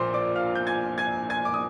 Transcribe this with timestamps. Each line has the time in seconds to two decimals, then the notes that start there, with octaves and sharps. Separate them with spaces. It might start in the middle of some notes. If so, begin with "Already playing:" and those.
Already playing: A#1 A#2 F3 C5 C6 D6
0.14 D5 D6
0.36 F5 F6
0.55 G6
0.67 G#5 G#6
0.98 G#5 G#6
1.30 G#5 G#6
1.45 D6
1.54 D#6